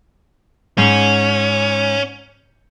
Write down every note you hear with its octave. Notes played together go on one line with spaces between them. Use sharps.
G#2 C#4 C7